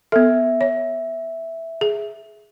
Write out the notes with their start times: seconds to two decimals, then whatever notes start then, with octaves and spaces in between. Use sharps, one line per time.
0.12 B3 A4 E5
0.61 C#5
1.81 G#4